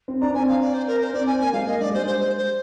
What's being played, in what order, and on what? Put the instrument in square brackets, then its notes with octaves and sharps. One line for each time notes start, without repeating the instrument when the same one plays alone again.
[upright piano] C4
[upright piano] D4 [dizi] A#5
[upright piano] C4 [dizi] G#5
[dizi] F5
D5
C5
A#4
C5
[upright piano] C4 [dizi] D5
[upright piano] C4 [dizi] G#5
[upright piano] A#3 [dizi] G#5
[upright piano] G#3 [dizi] F5
[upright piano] A#3 [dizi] D#5
[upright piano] D4 [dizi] D5
[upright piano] G#3
[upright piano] G3 [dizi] C5
[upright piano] G#3 [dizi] C5
[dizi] C5
C5